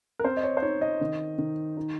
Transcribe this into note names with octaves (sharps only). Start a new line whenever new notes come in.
A#4
C4 C5
D#5
C#5
C5
D#4 C#5
D#5
D#3
D#3
D#4